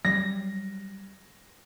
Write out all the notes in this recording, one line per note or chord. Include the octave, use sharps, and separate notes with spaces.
F#3 G3 A#6